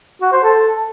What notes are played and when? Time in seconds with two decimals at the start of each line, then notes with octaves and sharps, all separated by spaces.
0.22 F#4
0.33 C5
0.43 A4